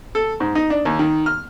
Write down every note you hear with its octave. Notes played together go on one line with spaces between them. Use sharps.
A4
G#2
D#4
D4
D#2
D#3
F6